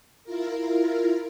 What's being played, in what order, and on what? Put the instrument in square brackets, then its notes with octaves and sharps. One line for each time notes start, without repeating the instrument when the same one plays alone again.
[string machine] E4 F4 A#4